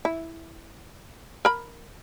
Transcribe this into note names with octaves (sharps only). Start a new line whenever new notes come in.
E4
A#4 B5